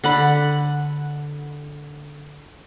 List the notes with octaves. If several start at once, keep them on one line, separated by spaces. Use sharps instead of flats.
D3 F#5 B5